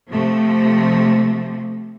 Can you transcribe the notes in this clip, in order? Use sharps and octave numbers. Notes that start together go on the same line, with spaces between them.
C3 F3 A3